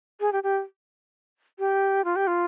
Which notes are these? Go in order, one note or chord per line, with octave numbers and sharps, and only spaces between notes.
G#4
G4
G4
G4
F4
G4
F4